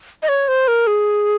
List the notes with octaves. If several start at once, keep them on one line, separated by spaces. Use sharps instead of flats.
D#5
C#5
C5
A#4
G#4